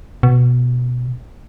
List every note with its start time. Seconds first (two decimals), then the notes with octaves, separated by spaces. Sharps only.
0.23 B2